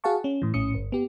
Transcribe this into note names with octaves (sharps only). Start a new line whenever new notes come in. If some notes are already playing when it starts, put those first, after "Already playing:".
F#4 G#4 F5 F#5 A5 C#6
C#4
A2 E3
A#1 A2 C#4 D#6 C#7
G1
B3 G4